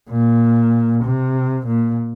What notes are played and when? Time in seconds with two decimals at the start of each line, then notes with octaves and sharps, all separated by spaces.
0.11 A#2
1.04 C3
1.67 A#2